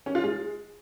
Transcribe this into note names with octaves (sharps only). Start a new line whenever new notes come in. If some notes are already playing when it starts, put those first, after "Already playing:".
C#4
F4
G#3